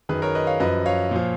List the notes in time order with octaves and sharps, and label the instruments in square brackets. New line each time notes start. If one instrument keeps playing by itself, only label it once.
[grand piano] F#2 D#3 G#4 B4
A#4 C#5
B4 D#5
C#5 F5
F#2 F3 B4 D#5
C#5 F5
A#2 F3